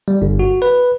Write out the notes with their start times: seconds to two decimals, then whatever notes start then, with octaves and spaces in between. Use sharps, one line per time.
0.08 G3
0.22 G1
0.39 F#4
0.62 B4